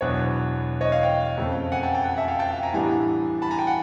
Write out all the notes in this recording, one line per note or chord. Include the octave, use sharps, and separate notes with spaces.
E2 B2 F#3 B3 D4 B4 C#5
C#5 D#5
D#5 F5
F5 G5
F2 C#3 F3 A3
F#5 G#5
G5 A5
G5 A5
F#5 G#5
E5 F#5
F5 G5
G5 A5
F5 G5
G#5 A#5
A2 E3 G3 B3 D4 G#5 A#5
A5 B5
G#5 A#5
G5 A5
F#5 G#5